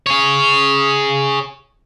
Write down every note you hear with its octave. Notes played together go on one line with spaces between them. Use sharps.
G#4 C#5